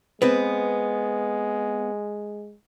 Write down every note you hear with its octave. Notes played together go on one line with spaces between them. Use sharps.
G#3 B3 C4 B4